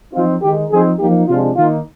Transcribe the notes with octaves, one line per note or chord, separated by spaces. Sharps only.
F3 C4 D#4 F4
D#3 G#3 D#4 G4
F3 C4 D#4 G#4
F3 A#3 D#4 G4
C3 F3 G#3 D4 F4
D#3 A#3 D#4 F4